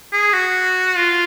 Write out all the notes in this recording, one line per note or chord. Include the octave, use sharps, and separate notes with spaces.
G#4
F#4
F4